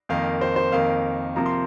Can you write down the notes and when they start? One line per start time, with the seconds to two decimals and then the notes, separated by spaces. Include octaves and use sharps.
0.09 F2 D#3 A#3 F5
0.41 C5
0.56 C5
0.72 F2 D#3 A#3 F5
1.36 C3 F3 A#3 A#5
1.46 C6